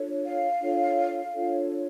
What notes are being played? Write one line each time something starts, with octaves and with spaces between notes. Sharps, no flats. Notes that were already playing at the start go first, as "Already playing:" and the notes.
Already playing: D4 F4 A4 C#5
F5
D4 F4 A4 C#5
D4 F4 A4 C#5